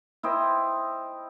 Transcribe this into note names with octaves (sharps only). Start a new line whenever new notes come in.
E4 C5 D#5 G5